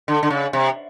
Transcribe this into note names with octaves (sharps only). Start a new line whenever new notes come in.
D3
D3
C#3
C3